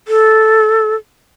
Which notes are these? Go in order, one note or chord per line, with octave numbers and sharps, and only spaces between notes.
A4